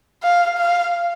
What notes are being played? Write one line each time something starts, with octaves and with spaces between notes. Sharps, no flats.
F5
F5